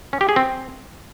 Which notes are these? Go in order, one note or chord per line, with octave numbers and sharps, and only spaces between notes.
C#4
G4
G#4
C4